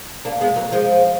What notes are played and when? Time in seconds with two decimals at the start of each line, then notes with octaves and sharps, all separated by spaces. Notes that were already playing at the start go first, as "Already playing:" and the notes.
0.25 A#3 D4
0.41 G#3 B3
0.56 F#3 A#3
0.72 F3 G#3